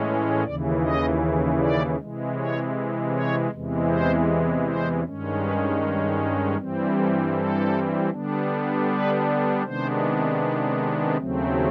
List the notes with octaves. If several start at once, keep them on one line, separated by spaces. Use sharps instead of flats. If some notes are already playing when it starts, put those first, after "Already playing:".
Already playing: A2 E3 G#3 C#4
D#2 C#3 E3 D5
D#5
D5
C3 E3 G#3
C#5
C#5
E2 C3 E3 G#3
C5
C5
G2 D#3 G#3 C#4
B4
G2 E3 G3 C4
A4
A4
D3 G3 B3 D4
B4
C3 D#3 G#3 B3 D4 C5
B4
D#2 C#3 F#3 A3 C4